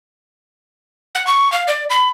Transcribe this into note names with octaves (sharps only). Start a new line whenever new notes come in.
F#5
C#6
F5
D5
B5